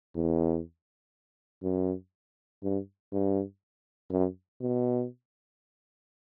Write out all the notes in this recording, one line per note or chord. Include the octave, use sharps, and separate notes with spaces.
E2
F#2
G2
G2
F#2
B2